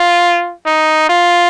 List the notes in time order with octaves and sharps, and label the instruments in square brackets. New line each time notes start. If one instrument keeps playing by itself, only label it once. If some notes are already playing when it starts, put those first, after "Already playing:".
Already playing: [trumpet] F4
D#4
F4